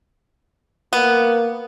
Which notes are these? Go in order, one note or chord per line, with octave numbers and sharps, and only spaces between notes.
A#3 B3